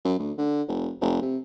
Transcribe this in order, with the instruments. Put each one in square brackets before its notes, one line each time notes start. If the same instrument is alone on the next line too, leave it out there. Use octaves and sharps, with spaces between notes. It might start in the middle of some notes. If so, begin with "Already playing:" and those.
[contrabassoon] F#2
D2
D3
F1
F1
C3